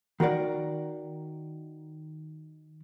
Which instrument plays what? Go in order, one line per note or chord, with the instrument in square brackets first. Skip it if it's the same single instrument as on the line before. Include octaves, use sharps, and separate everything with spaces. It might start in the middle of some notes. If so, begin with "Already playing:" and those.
[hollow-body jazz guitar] D#3 F#4 A#4 D5